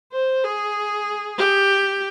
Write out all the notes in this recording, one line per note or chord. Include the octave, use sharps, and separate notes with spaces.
C5
G#4
G4